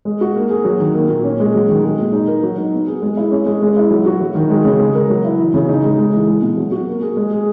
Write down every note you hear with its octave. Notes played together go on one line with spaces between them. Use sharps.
G#3
F#4
A#3
G#4
F#3
D#3
A#3
A#2
C#4
G#3
F#3
D#3
G#3
A#2
D#4
A#4
F#3
D#4
B3
G#4
G#3
E4
C#4
G#3
G#3
E4
F#3
F#4
F#3
D#3
G#3
C#3
G#3
A#4
F#3
E4
E3
C#3
D#4
G#3
G#3
E3
G#3
B2
F#3
F#4
A#3
G#4
G#3
G#4